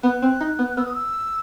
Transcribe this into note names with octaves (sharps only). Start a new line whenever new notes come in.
B3 F#6
C4
D#4
B3
B3 E6
D#6
E6